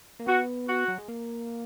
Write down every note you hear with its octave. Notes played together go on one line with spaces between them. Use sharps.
A#3
B3 F#4
F#4
F#3
G#3
A#3